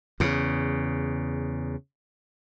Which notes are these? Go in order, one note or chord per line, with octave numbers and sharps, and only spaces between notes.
E2 C#3